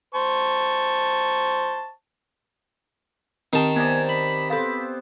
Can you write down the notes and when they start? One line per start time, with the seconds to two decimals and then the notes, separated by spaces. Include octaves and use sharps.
0.15 C5 A5 C#6
3.53 D#3 C4 G4 A5 D#6
3.76 C3 B3 D5 D#5 G#5
4.09 B5 F#7
4.50 B3 C4 A4 C5 F5 B5